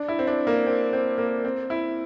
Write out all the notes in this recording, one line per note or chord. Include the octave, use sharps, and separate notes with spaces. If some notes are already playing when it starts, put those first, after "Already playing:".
Already playing: D4
E4
C4
D4
A#3
C4
C4
A#3
C4
E4